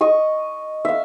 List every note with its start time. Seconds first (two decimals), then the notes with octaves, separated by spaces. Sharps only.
0.01 D#5 C#6 D#6
0.85 E5 F5